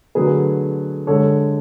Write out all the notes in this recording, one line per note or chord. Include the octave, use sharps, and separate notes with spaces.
D3 F#3 A3 G#4 B4
D3 G#3 A4 C#5